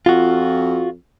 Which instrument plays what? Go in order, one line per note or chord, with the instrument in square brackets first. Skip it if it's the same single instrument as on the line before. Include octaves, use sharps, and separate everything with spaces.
[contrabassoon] F2 [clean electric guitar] F4 F#4